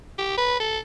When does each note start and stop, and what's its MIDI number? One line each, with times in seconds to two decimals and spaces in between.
0.18 0.33 67
0.38 0.59 71
0.60 0.79 69